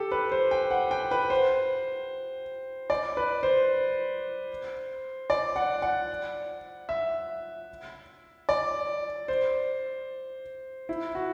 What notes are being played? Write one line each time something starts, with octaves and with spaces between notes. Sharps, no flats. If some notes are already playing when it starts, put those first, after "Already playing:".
Already playing: G4 A4
B4
C5
G5
F#5
G5
B4
C5
D5
B4
C5
D5
F#5
F#5
E5
D5
C5
E4
F#4